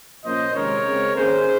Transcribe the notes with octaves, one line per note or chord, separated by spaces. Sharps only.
A#2 F3 A#3 C#4 C5 D#5
C3 D#3 G#3 C#4 A#4 C#5
C#3 G#3 C4
D#3 A#3 C#4 G#4 C5